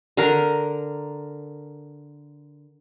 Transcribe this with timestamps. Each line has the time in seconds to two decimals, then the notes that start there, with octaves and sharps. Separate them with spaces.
0.17 D3 A#4